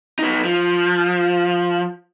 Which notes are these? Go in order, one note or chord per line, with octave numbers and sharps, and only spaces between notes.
B3 D#4
F3